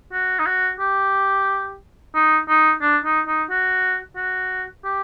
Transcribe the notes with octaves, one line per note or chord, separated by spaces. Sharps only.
F#4
D#4
F#4
G4
D#4
D#4
D4
D#4
D#4
F#4
F#4
G4